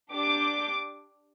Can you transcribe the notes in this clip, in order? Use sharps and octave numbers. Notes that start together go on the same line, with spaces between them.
D4 G4 D6